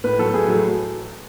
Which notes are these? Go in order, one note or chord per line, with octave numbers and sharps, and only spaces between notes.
A2 B4
F#3 A3 A4
A2 G#4
F#3 A3